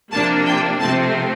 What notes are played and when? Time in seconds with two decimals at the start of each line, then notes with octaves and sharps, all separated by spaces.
0.13 C3 F3 A#3 D4 A5
0.47 G5
0.80 C3 F3 A3 C4 A5